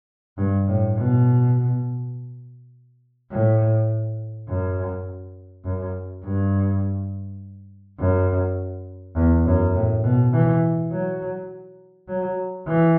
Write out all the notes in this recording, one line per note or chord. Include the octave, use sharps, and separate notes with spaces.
G2
A2
B2
A2
F#2
F#2
G2
F#2
E2
F#2
A2
B2
E3
F#3
F#3
E3